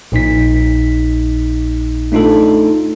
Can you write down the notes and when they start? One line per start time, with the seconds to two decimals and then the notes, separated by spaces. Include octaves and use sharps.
0.12 A#1 A#2 D#4 B6
2.12 A3 D4 D#4 F4 A4